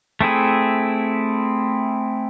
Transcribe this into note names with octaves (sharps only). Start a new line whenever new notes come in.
A3 C4 E4 G#4